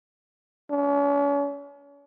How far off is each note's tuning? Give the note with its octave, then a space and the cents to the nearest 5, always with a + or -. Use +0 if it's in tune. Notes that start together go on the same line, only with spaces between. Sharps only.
C#4 +40